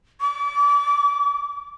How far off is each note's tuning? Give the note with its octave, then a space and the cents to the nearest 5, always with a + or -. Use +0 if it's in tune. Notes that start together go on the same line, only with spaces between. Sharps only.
D6 -35